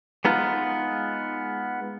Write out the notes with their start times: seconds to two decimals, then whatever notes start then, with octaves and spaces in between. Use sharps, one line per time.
0.25 G#3 B3 D#4 F4